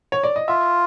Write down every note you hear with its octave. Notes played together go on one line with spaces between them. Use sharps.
C#5
D5
D#5
F4 E5